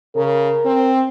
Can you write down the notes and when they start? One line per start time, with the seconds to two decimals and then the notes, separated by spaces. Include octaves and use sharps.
0.16 C#3 A#4
0.65 C4